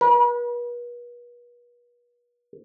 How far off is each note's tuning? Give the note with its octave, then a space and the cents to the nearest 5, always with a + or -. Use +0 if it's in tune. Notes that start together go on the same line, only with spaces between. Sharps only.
B4 -40